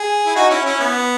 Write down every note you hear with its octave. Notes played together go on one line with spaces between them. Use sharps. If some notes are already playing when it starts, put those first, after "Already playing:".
Already playing: G#4
E4
D#4 F#4
C#4 E4
C#4 E4
B3